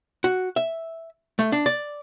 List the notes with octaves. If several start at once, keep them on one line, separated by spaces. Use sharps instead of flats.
F#4
E5
A3
D4
D5